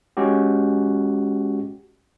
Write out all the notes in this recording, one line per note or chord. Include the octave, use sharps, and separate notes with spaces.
G#3 C#4 F#4 G4